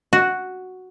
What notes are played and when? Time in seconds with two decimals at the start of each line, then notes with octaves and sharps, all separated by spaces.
0.13 F#4